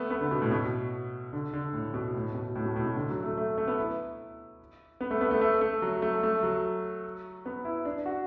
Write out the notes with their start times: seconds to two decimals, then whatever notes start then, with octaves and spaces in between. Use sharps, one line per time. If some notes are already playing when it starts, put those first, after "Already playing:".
Already playing: A3 B3
0.10 B3
0.21 D3
0.31 B2
0.42 A2
0.51 B2
1.33 D3
1.53 D3
1.73 A2
1.94 B2
2.14 A2
2.35 B2
2.56 A2
2.65 B2
2.76 A2
2.86 B2
2.96 D3
3.10 F#3
3.24 A3
3.38 A3
3.58 A3
3.68 B3
3.78 E4
5.01 B3
5.11 A3
5.21 B3
5.31 A3
5.41 A3
5.61 A3
5.82 F#3
6.02 A3
6.23 A3
6.43 F#3
7.46 B3
7.65 E4
7.85 D4
8.06 F#4